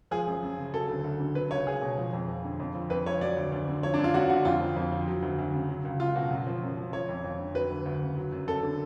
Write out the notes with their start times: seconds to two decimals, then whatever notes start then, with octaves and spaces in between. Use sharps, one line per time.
0.11 F3 G#4
0.27 F#2
0.43 F#2
0.58 C#3
0.74 F#3 A4
0.89 D2
1.04 D2
1.20 D3
1.35 F#3 B4
1.51 C#2 C#5
1.66 C#2 G#4
1.82 B2
1.98 F3
2.13 F2
2.28 F2
2.44 D3
2.60 F2
2.75 F3
2.90 F2 B4
3.06 F3 C#5
3.21 F#3 D5
3.37 D2
3.52 D2
3.68 D3
3.83 F3 C#5
3.94 D4
3.99 F#2
4.04 F4
4.14 F#2 F#4
4.29 D3 F#4
4.45 F2 F4
4.61 F3
4.76 F2
4.92 F3
5.08 F#3
5.22 D2
5.38 D2
5.53 C#3
5.69 F#3
5.85 C#2
6.00 C#2 F4
6.16 B2 F#4
6.31 F#2
6.47 F3
6.62 F#2
6.77 F3
6.93 F3 C#5
7.09 F2
7.24 F2
7.40 D3
7.55 F#3 B4
7.70 D2
7.86 D2
8.01 C#3
8.17 F#3
8.32 F#2
8.48 F#2 A4
8.63 D3